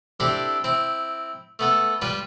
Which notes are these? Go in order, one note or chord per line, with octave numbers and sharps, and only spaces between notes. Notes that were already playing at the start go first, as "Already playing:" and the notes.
C4 D4 E4 G4 A4
C4 E4
A3 B3 A4
G3 F4 B4 G5